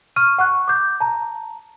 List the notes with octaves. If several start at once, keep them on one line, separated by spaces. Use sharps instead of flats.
C#6 F6 D#7
F#5 C#6 F#6
D6 G6
A5 A#5